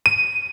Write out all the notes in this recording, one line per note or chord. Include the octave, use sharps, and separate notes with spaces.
D#7